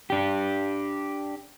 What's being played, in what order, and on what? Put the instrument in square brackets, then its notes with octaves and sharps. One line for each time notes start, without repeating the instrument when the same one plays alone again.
[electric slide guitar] D4 G4